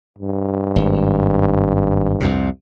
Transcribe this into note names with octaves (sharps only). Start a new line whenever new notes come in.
G2
G#1
C2 F2 C3